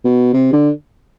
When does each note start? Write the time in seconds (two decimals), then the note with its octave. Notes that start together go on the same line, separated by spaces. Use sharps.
0.05 B2
0.34 C3
0.53 D3